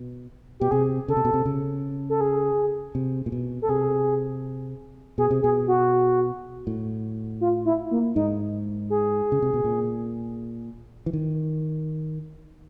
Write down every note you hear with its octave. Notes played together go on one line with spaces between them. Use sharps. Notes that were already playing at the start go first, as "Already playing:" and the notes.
Already playing: B2
B2 G4
C3 G#4
C#3 A4
C3
B2
C3
C#3
A4
G#4
C3
A#2
B2
A4
C3 G#4
B2 G#4
C3
B2 G#4
F#4
A2
F4
E4
A#3
G#2 D#4
G#4
C#3
C3
B2
A#2
E3
D#3